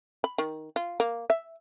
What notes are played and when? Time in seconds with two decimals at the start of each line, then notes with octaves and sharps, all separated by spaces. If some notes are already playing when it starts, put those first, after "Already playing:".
0.24 B5
0.38 D#3
0.76 F4
1.00 A#3
1.30 E5